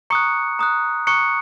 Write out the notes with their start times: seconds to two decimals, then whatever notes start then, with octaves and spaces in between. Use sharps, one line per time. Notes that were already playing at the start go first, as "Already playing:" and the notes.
0.10 A#5 C#6 D#6 F#6 C#7
0.59 A#5 D#6 F#6
1.07 A#5 C#6 D#6 F#6 C#7